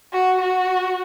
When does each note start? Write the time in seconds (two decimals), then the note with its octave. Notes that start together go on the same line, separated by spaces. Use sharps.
0.13 F#4
0.40 F#4